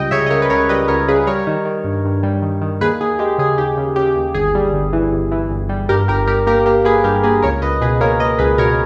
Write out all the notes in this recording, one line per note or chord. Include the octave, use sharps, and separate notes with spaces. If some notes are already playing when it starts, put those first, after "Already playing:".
Already playing: C#2 G3 D#5 G5
C#3 C#5 E5
D#5
C#3 A#4 C#5
B4
C#2 A#4 C#5
G3 B4 D#5
C#2 A#4 C#5
C#3 G#4 B4
G3 A#4 C#5
D#3
D#3
G2
G2
G3
D#3
D#3
D#2 G#4 B4
D#2 G#4
G#3 G4
C#3 G#4
D#2 G4
C#3
C#3 G4
D#2
G1 G#4
G3
G1
E3
G1
E3
G1
G3
G2 G4 A#4
G1 G4 A#4
G3 G4 A#4
A#3 G4 A#4
A#3 G4 A#4
A#3 G#4 B4
G2 G4 A#4
A#3 G#4 B4
C#2 A#4 C#5
C#2 B4 D#5
B2 G#4 B4
A#3 A#4 C#5
A#3 B4 D#5
C#2 G#4 B4
B2 A#4 C#5